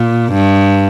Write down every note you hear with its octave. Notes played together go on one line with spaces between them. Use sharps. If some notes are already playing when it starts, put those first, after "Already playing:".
Already playing: A#2
G2